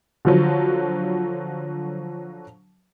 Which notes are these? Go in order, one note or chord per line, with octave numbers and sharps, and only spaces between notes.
D3 F3 F#3